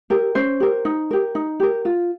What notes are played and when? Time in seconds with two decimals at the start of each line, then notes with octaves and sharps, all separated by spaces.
0.10 G4 A#4
0.35 C#4 C5
0.60 G4 A#4
0.85 D#4
1.11 G4 A#4
1.35 D#4
1.60 G4 A#4
1.85 F4